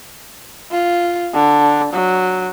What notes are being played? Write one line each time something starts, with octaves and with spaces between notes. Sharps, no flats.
F4
D3
F#3